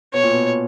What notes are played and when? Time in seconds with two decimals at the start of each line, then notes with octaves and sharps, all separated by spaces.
0.14 B2 C#5
0.24 A#2
0.33 B2